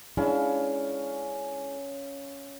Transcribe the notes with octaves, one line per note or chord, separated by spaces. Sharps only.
G#3 C#4 D4 E4 F5